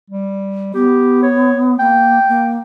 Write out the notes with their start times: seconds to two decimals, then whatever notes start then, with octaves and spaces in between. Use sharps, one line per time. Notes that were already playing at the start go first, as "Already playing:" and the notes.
0.10 G3
0.74 B3 G4
1.23 C#5
1.79 A#3 G5
2.28 A#3